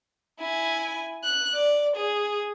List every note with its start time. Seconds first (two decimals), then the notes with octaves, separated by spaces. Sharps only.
0.40 E4 G#5
1.24 F#6
1.54 D5
1.96 G#4